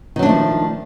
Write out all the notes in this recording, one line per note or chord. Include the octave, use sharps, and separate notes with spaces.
D#3 F3 F#3 A3 D4